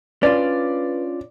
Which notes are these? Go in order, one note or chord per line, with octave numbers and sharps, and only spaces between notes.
C#4 D4 F4 B4 D5